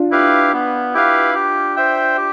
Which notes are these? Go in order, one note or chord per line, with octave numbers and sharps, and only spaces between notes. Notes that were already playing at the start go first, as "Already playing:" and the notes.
Already playing: D4 F4
E4 G4 B4 F5
B3
E4 G4 B4 F5
G4
C5 E5 G5
G4